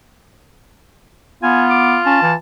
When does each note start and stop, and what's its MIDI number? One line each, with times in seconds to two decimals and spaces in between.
1.43 1.98 59
1.43 2.34 65
1.43 1.63 80
1.70 1.99 86
2.06 2.20 61
2.06 2.34 81
2.22 2.35 52